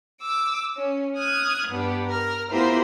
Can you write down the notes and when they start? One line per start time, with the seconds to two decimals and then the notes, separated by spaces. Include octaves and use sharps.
0.21 D6 E6
0.76 C#4
1.16 D#6 F6 F#6 G#6
1.70 G2 B3 D4 G4
2.06 A#4 F6
2.51 B3 E4 F4 G4 A#4 C5